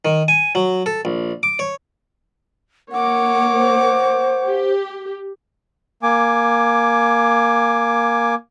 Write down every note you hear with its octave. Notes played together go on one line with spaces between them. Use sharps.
D#3
G#5
F#3
A4
A#1
D6
C#5
A#3 C#5 F#5 D6
C5
G4
A#3 G#5 D6